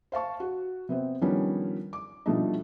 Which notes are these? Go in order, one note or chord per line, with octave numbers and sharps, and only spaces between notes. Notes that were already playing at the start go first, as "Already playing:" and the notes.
C5 F5 A5 C#6
F#4
C3 B3 C4
D#3 F3 G3 B3 C#4 D4
D6
B2 F3 G3 A3 D4 D#4